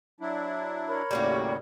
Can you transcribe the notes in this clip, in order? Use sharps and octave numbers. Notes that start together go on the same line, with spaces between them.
F#3 D4 E4
A#4 C#5 B5
D#2 A2 C#3 G3 A#3 F#4